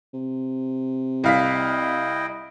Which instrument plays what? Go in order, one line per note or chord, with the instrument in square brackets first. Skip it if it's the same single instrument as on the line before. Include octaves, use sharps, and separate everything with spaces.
[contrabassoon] C3
[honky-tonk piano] C2 F5 B6 [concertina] E4 D#5 G5